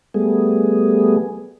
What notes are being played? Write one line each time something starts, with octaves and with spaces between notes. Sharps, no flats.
G3 A3 B3 G#4